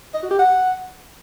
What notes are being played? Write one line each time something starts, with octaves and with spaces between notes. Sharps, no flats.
D#5
F#4
G4
F#5